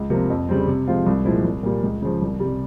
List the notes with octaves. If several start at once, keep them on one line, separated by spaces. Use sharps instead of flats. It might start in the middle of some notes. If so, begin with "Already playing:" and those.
Already playing: C#2
C3 F3 A#3
F2
C#3 G3 C4
C3
F3 G#3 C4 F4
C2
A#2 F3 G#3 E4
C2
A#2 G3 A#3
C#2
C#3 F3
C2
C3 G3